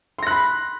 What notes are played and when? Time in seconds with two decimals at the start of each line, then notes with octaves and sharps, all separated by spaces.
0.18 C6
0.23 A#6
0.27 F#6
0.31 B5